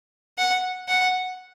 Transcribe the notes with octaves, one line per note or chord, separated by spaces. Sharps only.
F#5
F#5